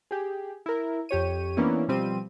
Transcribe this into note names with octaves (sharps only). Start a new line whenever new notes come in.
G4 G#4
E4 A#4
F2 G4 C#5 D#7
E3 A#3 B3 C#4 D4 E4
B2 F3 G3 C4 D#7